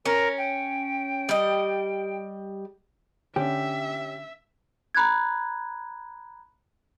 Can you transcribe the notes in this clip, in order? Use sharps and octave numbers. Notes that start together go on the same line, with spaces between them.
C#4 A#4
G5
G3 D#5
D3 C#4 G4 E5
A#5 B5 F#6 G#6